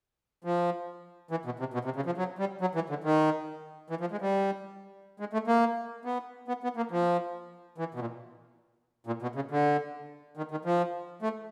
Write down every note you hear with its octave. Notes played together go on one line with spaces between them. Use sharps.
F3
E3
B2
C3
B2
C3
C#3
F3
F#3
G3
F#3
E3
D3
D#3
E3
F3
G#3
G3
G#3
A3
A#3
B3
B3
B3
A#3
F3
E3
B2
A#2
A#2
B2
C#3
D3
D#3
D#3
F3
A3